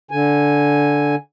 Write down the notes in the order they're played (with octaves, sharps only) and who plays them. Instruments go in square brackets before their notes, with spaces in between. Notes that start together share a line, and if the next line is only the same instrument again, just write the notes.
[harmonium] D3 G#5